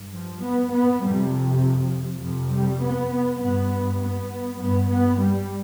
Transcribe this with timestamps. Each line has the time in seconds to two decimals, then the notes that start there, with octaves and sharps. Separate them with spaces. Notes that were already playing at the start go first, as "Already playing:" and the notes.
Already playing: G2
0.14 F3
0.43 B3
0.73 B3
1.02 F2 C3 G3
1.32 F3
2.21 F2 C3 F3
2.51 G3
2.80 B3
3.40 G2 B3
4.00 B3
4.59 G2 B3
4.89 B3
5.19 G3